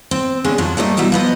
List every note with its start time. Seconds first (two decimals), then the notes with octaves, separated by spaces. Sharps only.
0.11 C4
0.44 D3 G#3 B3 C#4 D4 E4
0.58 F2 F3 F#3
0.77 G3 A3 A#3 C#5 D#5
0.97 B2 F#3 G3 E4 F#4
1.12 F3 B3 D#5